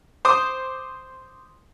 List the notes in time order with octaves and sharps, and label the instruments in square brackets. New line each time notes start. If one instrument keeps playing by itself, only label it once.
[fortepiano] C5 D6 D#6